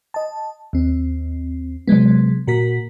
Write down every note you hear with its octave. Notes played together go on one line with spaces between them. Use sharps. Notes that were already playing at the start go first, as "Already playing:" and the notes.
D#5 A5
D#2 C4
C3 F#3 G#3 B3
A#2 F#4 A#4 B6